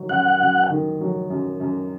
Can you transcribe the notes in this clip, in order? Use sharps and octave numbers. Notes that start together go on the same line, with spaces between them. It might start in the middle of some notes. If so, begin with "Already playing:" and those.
Already playing: D#3 F#3
F#2 F#5
F#2
D#3
F#3
F#2
F#2